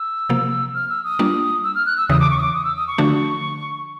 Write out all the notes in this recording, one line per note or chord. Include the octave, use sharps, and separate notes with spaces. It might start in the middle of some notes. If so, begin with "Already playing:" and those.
Already playing: E6
C3 F3 A#3
F6
E6
D#6
G3 A#3 D4 F4
E6
F6
F#6
E6
E2 C#3 E3 D#6
D6
C#6
D#6
D6
D#6
E6
D#6
C#6
D3 F3 A3 D4 F#4